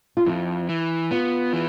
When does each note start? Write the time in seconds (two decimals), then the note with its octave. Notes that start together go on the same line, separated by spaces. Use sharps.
0.17 F4
0.26 F2 E4
0.69 E3
1.11 B3 F4
1.53 E3